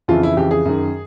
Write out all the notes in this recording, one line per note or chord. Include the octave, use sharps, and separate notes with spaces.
F2 C#3 E3 F4
E4
F2 C#3 E3 G4
G#4
F#2 D#3